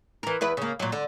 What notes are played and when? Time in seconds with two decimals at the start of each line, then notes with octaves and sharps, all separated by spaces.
0.23 E3 A#4
0.41 E2 E4 B4
0.57 C#3 A#3
0.79 A#2 F#3
0.92 D3